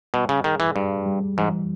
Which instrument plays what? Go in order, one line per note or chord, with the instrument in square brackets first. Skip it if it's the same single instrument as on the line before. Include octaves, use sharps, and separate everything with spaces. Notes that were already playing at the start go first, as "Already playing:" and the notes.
[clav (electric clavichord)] B2 [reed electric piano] G3
[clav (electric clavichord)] C#3
[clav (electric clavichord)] D#3 [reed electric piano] G#4
[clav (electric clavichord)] E3
[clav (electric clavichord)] G2 [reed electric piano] G3
[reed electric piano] G3
[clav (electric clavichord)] G#2 [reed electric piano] E3